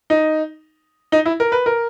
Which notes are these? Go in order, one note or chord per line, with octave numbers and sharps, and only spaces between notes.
D#4
D#4
E4
A#4
B4
A#4